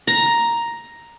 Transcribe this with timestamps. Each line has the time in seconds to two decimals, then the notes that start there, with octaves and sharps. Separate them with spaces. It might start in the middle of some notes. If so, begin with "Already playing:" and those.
0.07 A#5